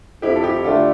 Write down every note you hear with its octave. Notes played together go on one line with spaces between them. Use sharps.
F2 E4 G4
A4
E4 G4
D3 A3 F4 A4